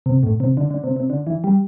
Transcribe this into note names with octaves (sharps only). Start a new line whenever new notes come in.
C3
A2
C3
D3
D3
C3
C3
D3
E3
G3